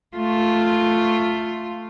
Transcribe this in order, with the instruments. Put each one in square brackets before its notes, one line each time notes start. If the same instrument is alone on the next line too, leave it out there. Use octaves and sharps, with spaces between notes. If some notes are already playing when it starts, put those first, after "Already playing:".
[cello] A3 F4